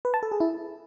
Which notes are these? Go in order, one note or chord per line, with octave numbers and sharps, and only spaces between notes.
B4
A5
A4
G#4
E4